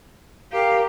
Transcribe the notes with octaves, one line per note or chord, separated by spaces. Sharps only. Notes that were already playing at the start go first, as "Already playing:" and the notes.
G4 A#4 F5 A#5